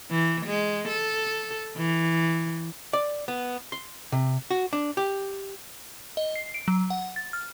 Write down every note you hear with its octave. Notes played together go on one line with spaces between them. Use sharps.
E3
G#3
A4
E3
D5
B3
C6
C3
F#4
D4
G4
D#5
C7
D7
F#3
F#5
A6
F6